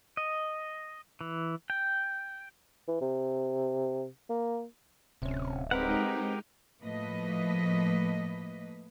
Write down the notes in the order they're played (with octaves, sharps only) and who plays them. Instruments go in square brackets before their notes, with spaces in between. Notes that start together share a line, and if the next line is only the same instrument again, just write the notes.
[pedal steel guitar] D#5
E3
G5
[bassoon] E3
C3
A#3
[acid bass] D1 [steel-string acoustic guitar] C3 C#4
[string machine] G#3 D#4 [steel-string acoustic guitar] C4 B4 [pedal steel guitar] G4 A#4 F#5
[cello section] A2 F3 A3 A#3 B4 D#5